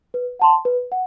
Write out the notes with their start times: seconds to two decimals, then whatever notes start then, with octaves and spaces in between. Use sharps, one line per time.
0.14 B4
0.39 F#5 A5 C6
0.65 B4
0.92 F#5